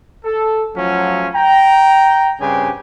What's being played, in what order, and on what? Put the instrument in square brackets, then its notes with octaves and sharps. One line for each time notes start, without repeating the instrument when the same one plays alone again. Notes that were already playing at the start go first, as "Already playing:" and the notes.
[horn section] A4
F3 F#3 A3 C#4 F4 F#4
G5 A#5
G2 C#3 C4 D4 G4 G#5